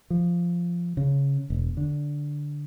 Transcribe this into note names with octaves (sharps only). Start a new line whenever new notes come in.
F3
C#3
E1
D3